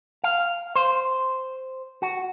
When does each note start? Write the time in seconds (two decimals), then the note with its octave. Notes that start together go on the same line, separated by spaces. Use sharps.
0.24 F5
0.76 C5
2.02 F#4